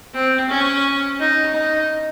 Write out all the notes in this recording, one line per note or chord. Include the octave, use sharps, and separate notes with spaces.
C4
C#4
D#4
D#4